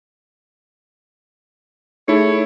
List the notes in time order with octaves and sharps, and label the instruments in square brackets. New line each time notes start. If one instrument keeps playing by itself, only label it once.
[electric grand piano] A3 E4 [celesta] D#4 G#4 C#7 [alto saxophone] C#5